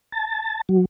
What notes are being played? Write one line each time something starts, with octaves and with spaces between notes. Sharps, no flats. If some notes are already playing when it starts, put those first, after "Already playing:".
A5
F#3